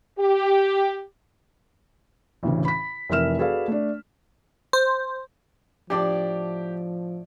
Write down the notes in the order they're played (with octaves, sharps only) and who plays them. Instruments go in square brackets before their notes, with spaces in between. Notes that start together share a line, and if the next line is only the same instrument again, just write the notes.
[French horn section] G4
[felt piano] A1 D2 C#3 E3
B5 B6
F1 E3 A#4 E5 F6 E7
F#4 G#4 A4 B4 D5 F5
A3 D4
[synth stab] C5
[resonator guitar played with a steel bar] A2 D4 D5 [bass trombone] F3 [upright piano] G4 D6